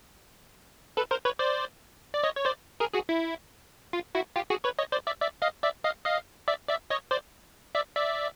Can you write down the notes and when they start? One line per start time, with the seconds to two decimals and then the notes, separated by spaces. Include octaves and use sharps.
0.97 A4 B4
1.11 A#4 C5
1.25 B4 C#5
1.39 C5 D5
2.14 D5
2.23 C#5 D#5
2.36 C#5
2.45 C5 D5
2.80 G#4 A#4
2.94 F#4 G#4
3.09 E4
3.93 F4
4.15 E4 F#4
4.36 F4 G4
4.50 F#4 G#4
4.64 B4 C#5
4.78 C#5 D#5
4.92 C5 D5
5.06 D5 E5
5.21 D5 E5
5.42 D#5 F5
5.63 D5 E5
5.84 D#5 F5
6.05 D#5 F5
6.48 D5 E5
6.68 D5 E5
6.90 C#5 D#5
7.11 C5 D5
7.75 D5 E5
7.96 D5 E5